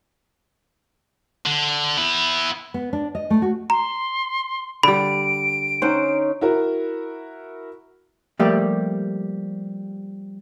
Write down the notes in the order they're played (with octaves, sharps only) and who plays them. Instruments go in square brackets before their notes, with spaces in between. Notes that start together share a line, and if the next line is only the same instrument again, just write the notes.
[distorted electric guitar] D3
B3 E4
[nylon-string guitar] B3
D4
D#5
A3
F#4
[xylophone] A#5 [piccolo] C6
[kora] D3 G3 [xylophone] B5 [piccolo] D7
[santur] C#4 D#4 [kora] C5 F#5
[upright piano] E4 F#4 A#4
[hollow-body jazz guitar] F3 G3 A3 A#3 G4 D5